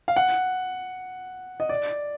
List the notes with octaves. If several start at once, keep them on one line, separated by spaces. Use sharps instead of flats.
F5
F#5
D#5
D5